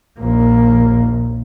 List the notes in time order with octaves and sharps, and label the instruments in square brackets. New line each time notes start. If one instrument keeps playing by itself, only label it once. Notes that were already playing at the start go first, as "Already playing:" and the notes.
[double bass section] A#1 D#2 A#2 [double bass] A#3